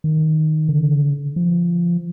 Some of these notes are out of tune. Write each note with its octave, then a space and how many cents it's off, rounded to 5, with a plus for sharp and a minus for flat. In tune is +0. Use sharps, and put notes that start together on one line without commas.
D#3 +0
D3 -40
F3 -15